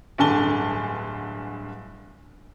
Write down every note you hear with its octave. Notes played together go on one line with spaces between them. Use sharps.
D1 G2 D3 G#5 A5 G7